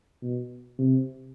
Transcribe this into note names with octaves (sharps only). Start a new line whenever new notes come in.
B2
C3